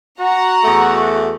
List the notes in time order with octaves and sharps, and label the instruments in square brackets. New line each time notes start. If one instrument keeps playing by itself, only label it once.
[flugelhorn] F#4 [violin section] F#5 A#5
[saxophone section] E2 A3